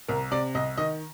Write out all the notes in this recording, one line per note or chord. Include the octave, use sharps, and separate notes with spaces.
C2 A#4
C3 D5
C2 D#5
D#3 D#5